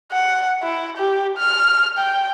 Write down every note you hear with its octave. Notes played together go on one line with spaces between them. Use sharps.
F#5
E4
G4
F6
G5